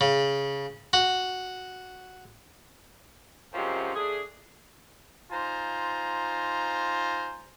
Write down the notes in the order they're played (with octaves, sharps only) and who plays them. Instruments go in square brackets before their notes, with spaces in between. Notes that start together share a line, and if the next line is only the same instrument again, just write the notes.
[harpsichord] C#3
F#4
[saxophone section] F#2 C3 F3 G#3 C#4
A3 D4 G#4
[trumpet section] D#4 F4 C5 G#5 A#5